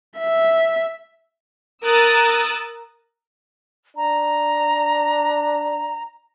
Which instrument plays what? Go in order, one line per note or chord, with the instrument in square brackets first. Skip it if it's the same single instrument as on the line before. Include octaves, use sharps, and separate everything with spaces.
[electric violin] E5
[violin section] A#4 D#6 E6 F#6 A6
[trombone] D4 [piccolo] A#5